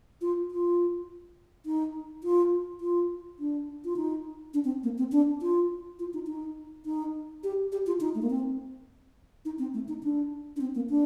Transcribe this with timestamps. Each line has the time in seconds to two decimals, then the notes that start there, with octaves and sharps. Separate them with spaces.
0.21 F4
0.51 F4
1.66 D#4
2.24 F4
2.81 F4
3.39 D4
3.85 F4
3.96 D#4
4.54 D4
4.65 C4
4.83 A#3
4.98 C4
5.12 D4
5.42 F4
5.99 F4
6.14 D#4
6.27 D#4
6.86 D#4
7.44 G4
7.72 G4
7.87 F4
8.01 D#4
8.15 A3
8.22 A#3
8.30 C4
9.45 D#4
9.59 C4
9.74 A3
9.88 D#4
10.03 D4
10.56 D4
10.61 C4
10.75 A#3
10.90 D4